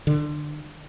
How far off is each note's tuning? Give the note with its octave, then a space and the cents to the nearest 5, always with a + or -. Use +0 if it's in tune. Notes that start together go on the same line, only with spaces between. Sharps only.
D3 +25